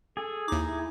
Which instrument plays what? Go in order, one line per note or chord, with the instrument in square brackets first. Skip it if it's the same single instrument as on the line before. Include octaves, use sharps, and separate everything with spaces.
[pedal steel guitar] G#4 [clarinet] A4
[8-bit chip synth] D#2 D6 [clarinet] D#4 [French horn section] E4